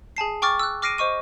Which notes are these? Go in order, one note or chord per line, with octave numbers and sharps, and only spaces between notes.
G#4 G#5 A5 C7
G5 C#6 D6 F6 A6
E6 F#6
D6 F6 A#6 C7 D7 D#7
C5 D#5 C#6 D#7